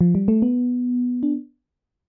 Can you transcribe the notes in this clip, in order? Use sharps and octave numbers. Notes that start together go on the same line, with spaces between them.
F3
G3
A3
B3
D4